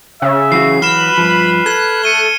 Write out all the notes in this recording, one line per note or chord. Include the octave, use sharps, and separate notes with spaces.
C#3 E5
E3 F#3 F#4 C7
B4 B5 F6 E7
G2 F3 F6
A4 F#6 G#6
A3 C#7 D#7 G7